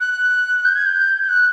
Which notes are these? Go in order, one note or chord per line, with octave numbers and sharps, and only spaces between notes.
F#6
G6
G#6
G6
G6
F#6